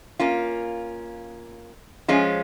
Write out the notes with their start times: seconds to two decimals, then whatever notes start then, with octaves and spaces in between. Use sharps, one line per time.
0.19 A#3 C#4 F4
2.08 F3 G#3 C#4 F4